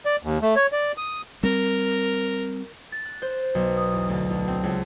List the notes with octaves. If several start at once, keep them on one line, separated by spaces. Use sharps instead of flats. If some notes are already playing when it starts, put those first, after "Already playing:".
D5
D#2
A3
C#5
D5
D#6
G3 C4 A#4
A6
F#6
C5
B1
D#6
E2
D2
D2
C4
C#2